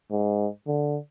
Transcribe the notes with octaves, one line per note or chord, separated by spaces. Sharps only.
G#2
D3